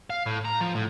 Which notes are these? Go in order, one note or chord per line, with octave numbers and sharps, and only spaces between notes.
F5
A2
A#5
F3
A2